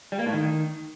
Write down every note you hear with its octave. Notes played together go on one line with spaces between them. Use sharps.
G3
A#3
A2
D#3